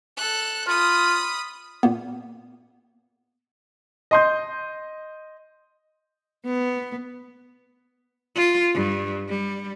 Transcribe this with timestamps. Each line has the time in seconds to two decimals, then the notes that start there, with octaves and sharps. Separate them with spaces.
0.17 A4 F#6
0.67 F4 B5 D#6
1.83 A#2 A#3 B3
4.11 D#5 C6 G6
6.46 B3
8.35 F4
8.74 G2
9.28 G3